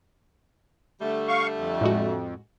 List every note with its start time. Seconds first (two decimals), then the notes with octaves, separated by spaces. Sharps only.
1.01 D3 G3 A3
1.28 F5 C#6
1.57 F2
1.81 A2 G#3 F#4